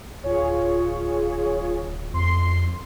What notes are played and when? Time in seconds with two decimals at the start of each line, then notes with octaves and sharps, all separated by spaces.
0.24 D1 F4 G#4 C#5
2.14 F2 C6 C7